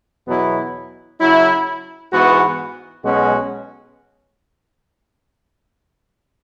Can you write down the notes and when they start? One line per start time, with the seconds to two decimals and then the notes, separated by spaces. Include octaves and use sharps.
0.27 E2 B2 F#3 B3 E4
1.20 C#3 F#3 E4
2.12 G#2 E3 B3 F#4
3.03 B1 B2 G#3 C#4 F#4